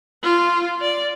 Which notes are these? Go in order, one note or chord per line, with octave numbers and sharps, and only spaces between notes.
F4
D5